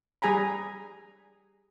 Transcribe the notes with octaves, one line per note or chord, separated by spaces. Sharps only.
G3 G#4 G#5 A#5 B5